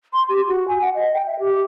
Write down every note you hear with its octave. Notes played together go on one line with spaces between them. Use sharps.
C6
G4
F#4
G#5
F#5
D#5
G5
E5
G4